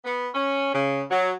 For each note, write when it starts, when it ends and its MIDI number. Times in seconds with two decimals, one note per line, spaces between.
0.05 0.28 59
0.34 0.72 61
0.73 1.03 49
1.10 1.32 54